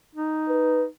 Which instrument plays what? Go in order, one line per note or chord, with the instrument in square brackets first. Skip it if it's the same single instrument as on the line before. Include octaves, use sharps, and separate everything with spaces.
[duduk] D#4
[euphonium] B4